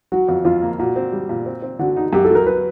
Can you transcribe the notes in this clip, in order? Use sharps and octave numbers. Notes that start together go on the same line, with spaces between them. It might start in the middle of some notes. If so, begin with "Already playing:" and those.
F#3 F#4
F2
F2 F4
A#3
A#2 F#4
C4
G3
A#2
C4
C4
D3 F#4
D#4
F#2 G4
A4
F#3 A#4
B4